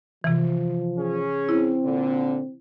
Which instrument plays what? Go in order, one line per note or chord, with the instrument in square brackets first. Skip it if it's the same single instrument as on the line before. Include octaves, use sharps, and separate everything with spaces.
[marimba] C3 E3 [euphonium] F3
[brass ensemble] C#4 G#4
[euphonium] C4 [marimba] E4
[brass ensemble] A#2 D3